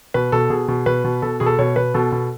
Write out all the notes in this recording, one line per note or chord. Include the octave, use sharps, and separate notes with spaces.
B2 B4
B2 A4
B2 G#4
B2
B2 B4
B2
B2 A4
B2 G#4
A4
B2 C#5
B2 B4
B2 A4
B2